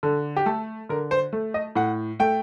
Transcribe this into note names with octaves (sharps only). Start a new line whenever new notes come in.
D3 A4
G4
A3 A4
D3 A#4
C5
A3
D#5
A2 F#5
A3 G5